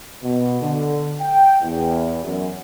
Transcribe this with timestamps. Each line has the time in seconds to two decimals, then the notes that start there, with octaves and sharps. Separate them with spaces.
0.23 B2
0.62 D3
1.21 G5
1.62 E2
2.24 F#2